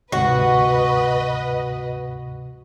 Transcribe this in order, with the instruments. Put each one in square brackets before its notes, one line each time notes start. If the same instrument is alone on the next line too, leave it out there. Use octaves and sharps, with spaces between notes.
[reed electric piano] D2 G#2 C3 [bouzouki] F#4 [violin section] B4 D#5